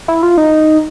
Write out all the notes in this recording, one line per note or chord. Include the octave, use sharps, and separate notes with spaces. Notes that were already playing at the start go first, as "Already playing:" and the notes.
E4
F4
D#4